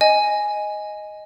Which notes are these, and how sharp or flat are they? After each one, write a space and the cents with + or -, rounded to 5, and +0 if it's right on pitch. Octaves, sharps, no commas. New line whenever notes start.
D#5 +0 G#5 +0